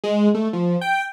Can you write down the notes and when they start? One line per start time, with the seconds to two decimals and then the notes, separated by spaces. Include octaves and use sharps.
0.04 G#3
0.34 A3
0.53 F3
0.81 G5